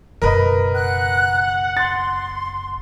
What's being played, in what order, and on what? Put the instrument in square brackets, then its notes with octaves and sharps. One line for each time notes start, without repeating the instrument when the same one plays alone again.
[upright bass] F#1 B2 [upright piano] A#4 B4 D#5
[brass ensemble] F#5 [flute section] F#6
[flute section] C6 [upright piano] A6